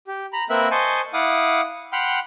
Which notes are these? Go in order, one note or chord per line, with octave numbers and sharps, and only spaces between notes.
G4
A#5 B5
A#3 C4 A#4 B4 E5 B5
C5 D#5 G#5 A5 C6 C#6
E4 F5 F#5 D6 D#6
F#5 G5 B5 C6 F6